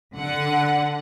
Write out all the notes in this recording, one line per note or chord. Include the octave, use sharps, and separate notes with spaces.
D3 F#5